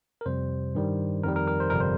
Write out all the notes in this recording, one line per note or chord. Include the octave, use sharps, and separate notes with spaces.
A#4
F2 C3 G3 C5
G2 D#3 G3
F2 D#3 G3 A#4
A#4
A#4
C5
G1 F2 C3 G3 A#4
C5